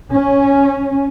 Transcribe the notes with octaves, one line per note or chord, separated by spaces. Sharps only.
C#4